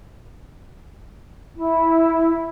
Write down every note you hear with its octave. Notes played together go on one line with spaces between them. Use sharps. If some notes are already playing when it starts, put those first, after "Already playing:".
E4